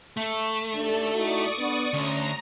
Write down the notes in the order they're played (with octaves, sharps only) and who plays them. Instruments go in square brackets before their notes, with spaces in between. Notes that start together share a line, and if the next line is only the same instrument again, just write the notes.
[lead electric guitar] A3
[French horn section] D#2 D4 [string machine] A4
[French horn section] D#4 E4 F#4 [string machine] D5 C#6 D#6
[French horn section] B3 D4
[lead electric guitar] D2 [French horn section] C#4 [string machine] A#5